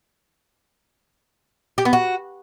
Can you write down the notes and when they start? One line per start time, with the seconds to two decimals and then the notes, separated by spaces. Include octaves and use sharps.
1.78 G4
1.85 B3
1.93 F#4